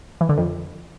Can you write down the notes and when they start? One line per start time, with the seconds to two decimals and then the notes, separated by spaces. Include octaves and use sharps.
0.21 E3
0.29 D3
0.38 F2